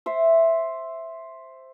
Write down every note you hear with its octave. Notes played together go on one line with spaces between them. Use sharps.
C5 E5